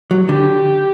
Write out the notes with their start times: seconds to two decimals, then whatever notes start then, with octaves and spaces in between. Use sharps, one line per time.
0.11 F#3
0.29 D3 G4